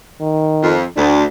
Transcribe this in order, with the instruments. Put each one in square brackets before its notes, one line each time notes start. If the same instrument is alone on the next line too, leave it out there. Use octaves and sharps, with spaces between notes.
[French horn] D#3
[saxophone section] F2
[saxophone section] D2 [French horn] D4